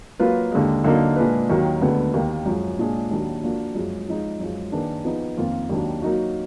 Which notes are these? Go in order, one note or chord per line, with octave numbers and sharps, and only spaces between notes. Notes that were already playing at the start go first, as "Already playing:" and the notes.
F#3 A#3 F4 B4
D#2 D3 G#3
D3 F#3 A#3 D#4
A#2 G#3 D4 G#4 B4
D#2 D#3 F#3
D2 D3 G#3 B3
D#2 D#3 A#3
F#2 F3 G#3
A#2 G#3 D4 G#4
D#2 D#3 F#3 D4
F3 A#3 D4 F#4
F#2 F3 G#3
F3 G#3 D#4
F#2 F3 G#3
D#3 A#3 D4 G#4 B4
F3 B3 D#4 G#4
F2 D#3 A#3 F4
D#2 D#3 F#3 D4
F#3 A#3 D#4 F#4